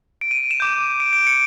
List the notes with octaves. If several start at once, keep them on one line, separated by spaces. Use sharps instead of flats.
D7
D#7
E7
D6 G6
D7
D7
C#7